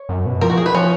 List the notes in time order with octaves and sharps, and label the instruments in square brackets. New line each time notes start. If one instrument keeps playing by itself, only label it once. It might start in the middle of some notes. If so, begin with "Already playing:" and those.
Already playing: [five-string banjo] C#5
[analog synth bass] F#2
B2
[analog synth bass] F3 [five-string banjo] A#4
[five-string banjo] F#4
G#4
B4
[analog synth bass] F3 [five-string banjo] C#4